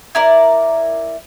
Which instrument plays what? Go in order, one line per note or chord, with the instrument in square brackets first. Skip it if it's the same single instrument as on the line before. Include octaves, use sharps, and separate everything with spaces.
[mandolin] E4 A#4 D5